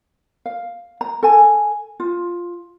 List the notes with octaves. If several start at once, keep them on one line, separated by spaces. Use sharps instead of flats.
F5
A#5
A4 G#5
F4